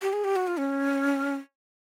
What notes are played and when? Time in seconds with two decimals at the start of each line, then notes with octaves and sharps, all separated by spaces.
0.02 G4
0.13 G#4
0.24 G4
0.36 F#4
0.47 F4
0.59 C#4